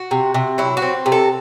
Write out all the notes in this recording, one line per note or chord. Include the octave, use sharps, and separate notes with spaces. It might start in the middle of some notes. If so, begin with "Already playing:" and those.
Already playing: F#4
C3
C3
F#3 E4
F#4
C4
C3
A4